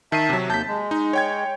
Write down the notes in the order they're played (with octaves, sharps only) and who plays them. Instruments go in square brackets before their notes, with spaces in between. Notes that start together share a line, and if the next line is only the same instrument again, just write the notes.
[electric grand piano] D#3 C7 D#7 [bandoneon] E5 A5
[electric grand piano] C3 F#3
[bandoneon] D#2 G6 [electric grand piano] A5 B6
[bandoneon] G#3
[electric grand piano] D#4
C#5 G5 G#6